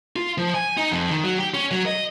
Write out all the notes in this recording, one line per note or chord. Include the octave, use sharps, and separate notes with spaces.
F4
F3
G#5
D#4
F2
D#3
F#3
G4
C#4
F#3
D#5